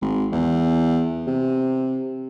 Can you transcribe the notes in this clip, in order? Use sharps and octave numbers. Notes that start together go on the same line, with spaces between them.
G#1
E2
C3